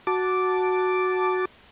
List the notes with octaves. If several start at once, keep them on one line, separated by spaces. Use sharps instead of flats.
F#4 A5 D6